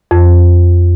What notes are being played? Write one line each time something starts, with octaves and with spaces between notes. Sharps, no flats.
F2